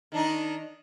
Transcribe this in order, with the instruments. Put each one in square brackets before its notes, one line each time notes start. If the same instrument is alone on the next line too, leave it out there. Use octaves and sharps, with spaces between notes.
[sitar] D#3 D4 D#4